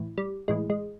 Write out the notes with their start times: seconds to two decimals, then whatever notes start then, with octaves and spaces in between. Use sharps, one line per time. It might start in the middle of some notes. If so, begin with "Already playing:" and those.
Already playing: A2 E3
0.18 G3
0.48 A2 E3 G#3
0.70 G#3